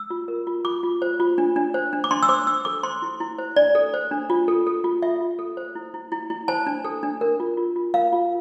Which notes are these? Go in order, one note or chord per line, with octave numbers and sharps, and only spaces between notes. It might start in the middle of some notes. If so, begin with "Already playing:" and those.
Already playing: E6
F4
A#4
F4
F4 D6
F4
C5
F4
D4
D4
C5
D4
D6
D4 C6
E6
C5 D6
D4 E6
A4 D6
C5 C6
E4
E4
C5
D4 D5
A4
C5
D4
F4
A4
A4
F4
F4 E5
F4
A4
C5
E4
E4
E4
E4
C5 A5
D4
A4
D4
A#4
F4
F4
F4
A#4 F5
F4